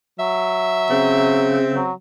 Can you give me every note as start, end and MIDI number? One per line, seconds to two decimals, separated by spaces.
0.19 1.62 54
0.19 1.81 76
0.90 1.92 49
0.90 1.89 60
1.74 1.92 54